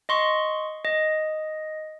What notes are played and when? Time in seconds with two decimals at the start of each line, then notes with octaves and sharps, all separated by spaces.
0.09 D#5 C6 C#6
0.85 D#5